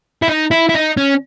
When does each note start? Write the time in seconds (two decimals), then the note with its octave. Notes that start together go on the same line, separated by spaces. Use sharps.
0.22 E4
0.28 D#4
0.51 E4
0.69 E4
0.75 D#4
0.97 C#4